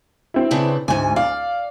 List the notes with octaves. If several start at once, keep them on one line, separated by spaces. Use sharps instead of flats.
C4 E4
C#3 D4 B4
D2 G#2 G#5
D5 F5